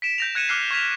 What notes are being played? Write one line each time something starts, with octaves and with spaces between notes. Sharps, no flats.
B6 D7 E7
G6 A#6 F7
F#6 G#6 C#7 D#7 E7
D6 F6 F#6 C7
C#6 G#6 B6 F7